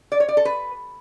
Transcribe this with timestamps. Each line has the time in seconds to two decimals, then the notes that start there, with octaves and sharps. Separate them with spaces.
0.12 D5
0.20 C#5
0.29 D5
0.37 A4
0.45 B4